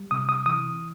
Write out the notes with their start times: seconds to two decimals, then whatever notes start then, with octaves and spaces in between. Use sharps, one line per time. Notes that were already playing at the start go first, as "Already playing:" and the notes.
Already playing: G3
0.11 C3 D#6
0.29 D#6
0.46 E3 D#6